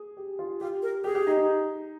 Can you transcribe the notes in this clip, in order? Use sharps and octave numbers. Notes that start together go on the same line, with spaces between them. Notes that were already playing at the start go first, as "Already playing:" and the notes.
Already playing: G#4
G4
F4
F4 G4
A#4
G4 G#4
G4
D#4
D#4